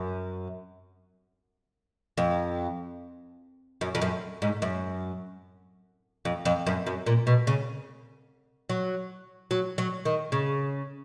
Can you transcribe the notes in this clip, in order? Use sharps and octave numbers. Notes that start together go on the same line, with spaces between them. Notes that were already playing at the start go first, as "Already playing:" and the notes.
Already playing: F#2
F2
F#2
F2
F#2
G#2
F#2
F2
F2
F#2
F#2
A#2
B2
C#3
F#3
F#3
F#3
D#3
C#3